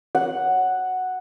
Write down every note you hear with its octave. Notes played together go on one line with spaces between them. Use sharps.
F#5